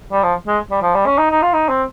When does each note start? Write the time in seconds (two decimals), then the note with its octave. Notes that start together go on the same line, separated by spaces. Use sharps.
0.12 G3
0.23 F3
0.47 G#3
0.71 G3
0.82 F3
0.95 G3
1.06 C#4
1.18 D#4
1.30 D#4
1.42 F4
1.53 D#4
1.69 C4